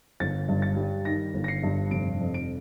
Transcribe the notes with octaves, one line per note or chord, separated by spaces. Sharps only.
G1 A6
G2
A6
G3
D#3 A#6
G1
A#6
C7
G2
F1 D7
F2
D7